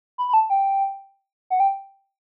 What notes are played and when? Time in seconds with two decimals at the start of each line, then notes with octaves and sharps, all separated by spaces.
0.18 B5
0.29 B5
0.34 A5
0.50 G5
1.50 F#5
1.60 G5